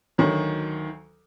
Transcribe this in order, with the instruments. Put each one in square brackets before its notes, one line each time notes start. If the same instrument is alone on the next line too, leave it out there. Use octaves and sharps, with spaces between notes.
[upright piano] D2 D#3 F#3